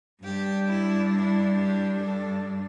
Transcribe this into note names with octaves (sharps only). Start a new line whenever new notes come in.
G2 G3 D4 G4
E4
E4
G4
A4